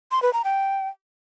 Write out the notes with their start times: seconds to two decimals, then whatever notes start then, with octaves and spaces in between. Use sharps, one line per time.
0.11 C6
0.22 B4
0.33 A#5
0.44 G5